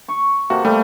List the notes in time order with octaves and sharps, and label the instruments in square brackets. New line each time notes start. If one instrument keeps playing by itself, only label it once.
[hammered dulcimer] C#6
[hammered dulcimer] C3 A#3 A4 [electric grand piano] F#4
[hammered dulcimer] G3 [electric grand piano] A3